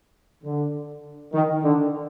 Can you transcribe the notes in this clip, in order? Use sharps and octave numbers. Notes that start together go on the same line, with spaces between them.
D3
D#3
D3